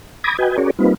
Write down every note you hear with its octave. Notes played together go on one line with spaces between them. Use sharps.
B5 D6 D#6 G#6 A#6
F#4 B4 D#5 G5 G#5
C#4 F#4 G#4 A#4 C#5 D5
G3 A#3 C4 D#4 F4 B4